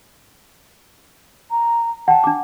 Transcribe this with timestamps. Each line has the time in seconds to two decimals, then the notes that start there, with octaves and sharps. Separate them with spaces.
1.51 A#5
2.08 F#5 G5 A5
2.24 D4 D6